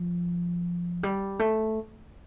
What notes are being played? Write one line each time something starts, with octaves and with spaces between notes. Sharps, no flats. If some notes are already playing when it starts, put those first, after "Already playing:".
Already playing: F3
G3
A3